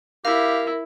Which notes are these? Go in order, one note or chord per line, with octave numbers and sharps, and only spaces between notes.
E4 G4 A#4 F5